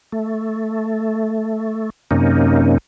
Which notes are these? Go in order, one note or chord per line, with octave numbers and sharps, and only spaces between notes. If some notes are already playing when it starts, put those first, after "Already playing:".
A3
F#2 C3 A#3 C#4 D#4